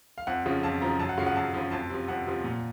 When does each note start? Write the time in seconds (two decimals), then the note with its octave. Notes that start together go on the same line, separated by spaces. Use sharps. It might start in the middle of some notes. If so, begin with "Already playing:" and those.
0.18 F5
0.27 F2 F#5
0.46 C#3 F3
0.63 F2 A5
0.81 C#3 F3 A#5
1.00 F#2 A5
1.09 F#5
1.18 C#3 F3 F5
1.27 F#5
1.36 F#2 A5
1.54 C#3 F3
1.71 F2 A5
1.90 C3 F3
2.08 F2 F#5
2.27 C3 F3
2.44 A#2